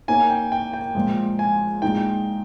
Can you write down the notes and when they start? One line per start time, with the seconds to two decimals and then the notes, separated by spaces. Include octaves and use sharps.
0.08 A#3 D#4 A#4 C#5 G#5
0.30 G5
0.52 G5
0.73 G5
0.95 A#2 F3 G#3
1.39 G#5
1.82 A#2 G#3 D#4 G5